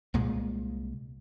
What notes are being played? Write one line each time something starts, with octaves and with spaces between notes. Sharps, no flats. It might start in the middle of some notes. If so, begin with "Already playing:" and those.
C2 A#2 G#3